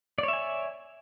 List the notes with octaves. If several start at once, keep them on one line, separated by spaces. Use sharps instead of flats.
C#5 D5 E5 G#5